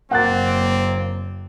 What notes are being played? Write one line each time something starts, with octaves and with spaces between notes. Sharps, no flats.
F#1 A#3 C4 F#5 F#6 A6